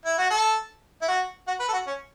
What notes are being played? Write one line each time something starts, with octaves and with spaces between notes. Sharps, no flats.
E4
F#4
A4
E4
F#4
F#4
B4
A4
F#4
C#4